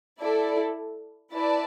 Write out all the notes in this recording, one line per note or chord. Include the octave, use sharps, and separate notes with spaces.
E4 A4 D5
E4 B4 D5 A5